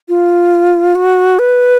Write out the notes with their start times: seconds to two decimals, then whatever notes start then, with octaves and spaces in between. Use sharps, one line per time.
0.09 F4
0.95 F#4
1.39 B4